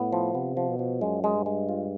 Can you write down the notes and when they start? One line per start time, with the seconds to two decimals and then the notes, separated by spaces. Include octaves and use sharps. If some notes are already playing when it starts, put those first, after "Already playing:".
Already playing: A2 B3
0.13 F3
0.34 C3 B3
0.57 F3
0.68 B2
0.79 F3
1.01 F#2 G#3
1.24 G#3
1.35 G2
1.46 G#3
1.69 F4